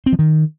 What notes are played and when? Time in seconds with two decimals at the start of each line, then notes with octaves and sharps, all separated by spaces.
0.06 C4
0.13 F3
0.19 D#3